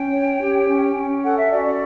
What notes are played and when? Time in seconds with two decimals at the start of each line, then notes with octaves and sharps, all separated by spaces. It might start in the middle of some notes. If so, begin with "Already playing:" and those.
Already playing: C#4 G5
0.12 C#5
0.40 G4
0.68 C#4
0.96 C#4
1.24 A4 F#5
1.37 E5
1.51 F#4 D5
1.66 D5